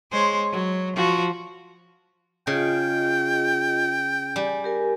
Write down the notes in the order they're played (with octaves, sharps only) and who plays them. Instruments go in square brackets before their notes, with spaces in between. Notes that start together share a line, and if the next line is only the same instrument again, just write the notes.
[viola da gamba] G#3 C5 C#5
F#3
F3 F#4
[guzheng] C#3 [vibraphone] F4 G#4 D#5 [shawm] G5
[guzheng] G3 [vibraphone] G#5
[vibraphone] G4 A#4 G#5